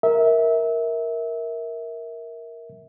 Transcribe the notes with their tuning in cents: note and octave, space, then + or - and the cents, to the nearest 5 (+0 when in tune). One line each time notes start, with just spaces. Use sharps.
A#4 +0 E5 -25